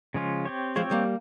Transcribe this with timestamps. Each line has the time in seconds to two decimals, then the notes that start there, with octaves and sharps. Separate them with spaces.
0.14 C#3 F3 G#3 C#4 F4
0.45 C4 G4 C#5
0.76 F3 G#3 C4 G4 C#5
0.91 G3 A#3